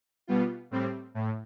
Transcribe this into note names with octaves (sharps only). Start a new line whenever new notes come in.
B2 G3 B3 F4
A2 G3 C4
A2